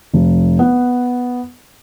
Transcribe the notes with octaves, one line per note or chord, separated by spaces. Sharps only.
F1
B3